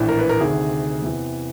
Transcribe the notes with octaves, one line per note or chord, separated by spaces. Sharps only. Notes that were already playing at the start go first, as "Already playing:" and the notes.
Already playing: A#1 A2 E3
A#4
B4
A#4
D2 C3 D#3 G#4
E2 C3 E3